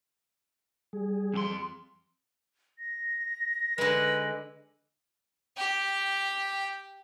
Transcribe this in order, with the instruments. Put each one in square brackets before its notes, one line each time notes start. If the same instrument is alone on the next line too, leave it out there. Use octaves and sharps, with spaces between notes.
[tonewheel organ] G3 G#4
[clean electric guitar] F2 G4 C6
[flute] A#6
[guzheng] D3 G#3 [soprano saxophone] B4
[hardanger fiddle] G4 G5